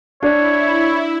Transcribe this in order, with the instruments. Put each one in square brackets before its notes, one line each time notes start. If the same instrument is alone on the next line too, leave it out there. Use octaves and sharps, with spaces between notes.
[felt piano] D4 [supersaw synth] E4 [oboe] C#5